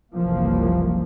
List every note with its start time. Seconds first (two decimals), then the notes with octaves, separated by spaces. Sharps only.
0.14 F#1 C2 E3 F3 A#3